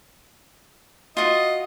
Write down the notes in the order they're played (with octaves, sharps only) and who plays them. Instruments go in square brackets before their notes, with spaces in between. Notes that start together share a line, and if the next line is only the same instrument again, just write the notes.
[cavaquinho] F4 F#4 [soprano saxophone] D#5